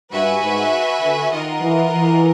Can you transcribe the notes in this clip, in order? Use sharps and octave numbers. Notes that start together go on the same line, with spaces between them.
G2 F#4 B4 E5 G#5
G#2
D3
D#3 F4 A#4 D#5 F#5
E3
E3